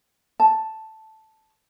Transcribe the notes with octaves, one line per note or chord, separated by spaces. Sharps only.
A5